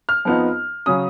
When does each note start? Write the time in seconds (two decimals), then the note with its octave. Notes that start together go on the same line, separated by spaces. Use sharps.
0.09 F6
0.25 F2 F3 B3 D#4
0.86 C#3 F#3 C#4 D#6